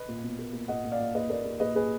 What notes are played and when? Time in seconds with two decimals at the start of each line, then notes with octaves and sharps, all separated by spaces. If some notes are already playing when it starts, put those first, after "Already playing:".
Already playing: B4 D#5
0.08 A#2
0.23 B2
0.39 A#3
0.53 A#3
0.68 A#2 D#5 F#5
0.84 A#2
0.91 D5 F5
0.99 A#2
1.14 D#2 B4 D#5
1.30 D#2 A#4 D5
1.45 D#2
1.60 A#2 B4 D#5
1.75 A#2 G#4 B4